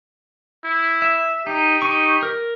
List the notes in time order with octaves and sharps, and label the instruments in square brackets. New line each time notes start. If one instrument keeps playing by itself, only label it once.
[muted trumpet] E4
[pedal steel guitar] E5
[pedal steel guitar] D#4 [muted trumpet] G4
[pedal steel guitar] D#4 C#6
A#4